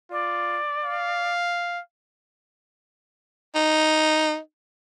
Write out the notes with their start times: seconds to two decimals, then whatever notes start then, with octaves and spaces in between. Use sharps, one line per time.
0.11 F4 D5
0.84 F5
3.55 D#4